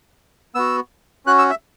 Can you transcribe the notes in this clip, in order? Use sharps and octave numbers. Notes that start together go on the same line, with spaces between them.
B3 F#4 E6
C#4 F#4 F#6
E6
E5